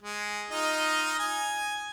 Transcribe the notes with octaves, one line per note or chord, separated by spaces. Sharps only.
G#3
D#4 F4 D#5
G#5